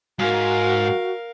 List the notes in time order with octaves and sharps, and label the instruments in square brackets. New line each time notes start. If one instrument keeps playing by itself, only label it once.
[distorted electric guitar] G#2 [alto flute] F#4 [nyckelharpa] A#4 F5